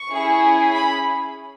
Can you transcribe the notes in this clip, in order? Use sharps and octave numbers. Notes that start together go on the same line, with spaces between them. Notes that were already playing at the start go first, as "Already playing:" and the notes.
Already playing: C#6
C#4 E4 G#4
B5